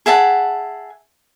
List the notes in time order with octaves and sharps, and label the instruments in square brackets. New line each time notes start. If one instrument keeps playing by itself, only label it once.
[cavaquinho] G#4 E5 F#5 A5